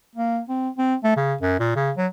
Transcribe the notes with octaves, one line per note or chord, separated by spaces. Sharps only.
A#3
C4
C4
A3
C#3
F#2
A#2
C#3
F#3